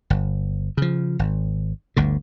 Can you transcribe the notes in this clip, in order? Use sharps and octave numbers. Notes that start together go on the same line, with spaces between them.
G1
C#3 F3
G#1
G1 D2 D3